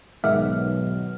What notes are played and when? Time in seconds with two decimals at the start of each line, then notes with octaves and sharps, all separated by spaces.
0.24 B1 G#2 D#3 E5 F#5 D6 F6